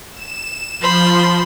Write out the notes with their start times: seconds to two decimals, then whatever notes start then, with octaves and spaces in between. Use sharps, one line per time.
0.12 E7
0.80 F3 C5 B5 C6